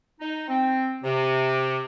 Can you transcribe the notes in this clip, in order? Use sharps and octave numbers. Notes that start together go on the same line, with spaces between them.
D#4
C4
C3